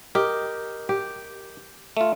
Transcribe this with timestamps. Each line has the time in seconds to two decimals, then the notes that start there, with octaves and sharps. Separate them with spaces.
0.15 G4 A#4 D#5
0.89 G4
1.97 A3 F4